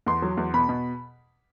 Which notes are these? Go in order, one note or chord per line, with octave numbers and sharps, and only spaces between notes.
E2 C6
F#3
E2
B2 B5
B2